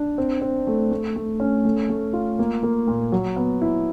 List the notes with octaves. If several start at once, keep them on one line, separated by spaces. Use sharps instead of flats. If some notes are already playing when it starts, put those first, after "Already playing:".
Already playing: D4
C4
C4
A3
A3
A3
C#4
A3
A3
F4
A#3
A#3
A#2
F#3
B3
E4